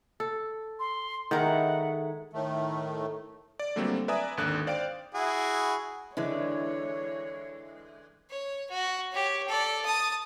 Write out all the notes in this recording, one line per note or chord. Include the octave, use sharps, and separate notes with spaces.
A4
C6
D#3 G#3 A3 E4 A#4 F#5
A2 D#3 A3
D5
D3 F#3 G3 A3 A#3 C4
B4 D5 E5 G#5 A#5 D#6
G#1 D#2 D3 F#6
C5 D5 F5 G5 D7
E4 F#4 G#4
D3 E3 G#3 C#5
C#5
F#4
G4 C#5
A4 D5
A5 D#6